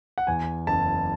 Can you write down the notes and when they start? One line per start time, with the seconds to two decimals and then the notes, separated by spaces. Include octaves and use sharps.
0.18 F#5
0.27 E2 G#5
0.67 F#1 A5